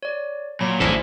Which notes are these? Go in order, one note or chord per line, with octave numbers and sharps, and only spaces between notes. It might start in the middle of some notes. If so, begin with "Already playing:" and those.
C#5 D5
A#2 F#3 B5
A1 D2 G#2 E4 A4 C5 D5 G#5